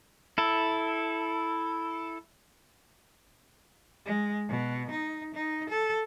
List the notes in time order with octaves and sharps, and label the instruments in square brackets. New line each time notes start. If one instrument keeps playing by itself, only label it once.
[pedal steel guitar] E4 A4
[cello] G#3
B2
D#4
D#4
A4